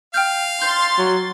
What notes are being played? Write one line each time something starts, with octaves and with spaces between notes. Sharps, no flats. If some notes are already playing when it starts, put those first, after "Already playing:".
F5 G5 F6 G6
C6 G6 A6
F#3